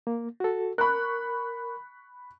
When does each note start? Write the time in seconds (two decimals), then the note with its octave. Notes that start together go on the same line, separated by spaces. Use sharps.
0.07 A#3
0.40 F#4 A4
0.78 A#4 B5 C#6 F#6